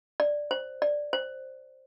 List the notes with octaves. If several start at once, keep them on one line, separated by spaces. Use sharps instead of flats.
D5
C5
D5
C5